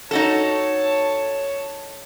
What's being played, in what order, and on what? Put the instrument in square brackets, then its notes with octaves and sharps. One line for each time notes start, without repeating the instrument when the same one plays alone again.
[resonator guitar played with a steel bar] D#4 F#4 A4 [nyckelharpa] C#5 A5